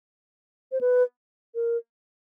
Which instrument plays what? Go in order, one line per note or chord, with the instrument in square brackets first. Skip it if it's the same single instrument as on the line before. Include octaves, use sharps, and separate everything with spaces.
[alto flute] C5
B4
A#4